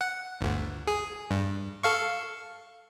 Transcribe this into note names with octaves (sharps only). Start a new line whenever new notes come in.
F#5
G1 D2
G#4
G2
A4 F5 C#6